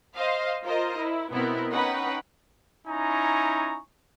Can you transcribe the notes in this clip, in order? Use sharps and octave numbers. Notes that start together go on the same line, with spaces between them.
C5 D#5 F5
F4 A#4 C5 D#5
E4
B2 B3 C4 E4 A#4
C#4 D#4 B4 F#5 G5
C#4 D#4 E4 G#5 A#5 C#6